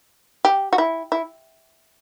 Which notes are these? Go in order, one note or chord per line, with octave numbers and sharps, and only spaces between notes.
G4
F#4
E4
E4